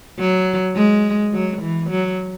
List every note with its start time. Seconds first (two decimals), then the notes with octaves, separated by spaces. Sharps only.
0.19 F#3
0.76 G#3
1.33 F#3
1.62 E3
1.90 F#3